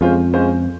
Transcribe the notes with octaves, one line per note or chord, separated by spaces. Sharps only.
F2 G#3 C#4 F4 C5
G#3 C#4 F4 C5